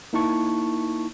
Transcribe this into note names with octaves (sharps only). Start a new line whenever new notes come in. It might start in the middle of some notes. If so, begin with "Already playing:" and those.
A#3 D#4 E4 A5 C#6